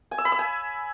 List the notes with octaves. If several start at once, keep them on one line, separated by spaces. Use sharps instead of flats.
G#5
E6
B5
E6
G#5